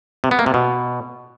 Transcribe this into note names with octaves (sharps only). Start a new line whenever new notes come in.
C3
B3
A#3
C3
B2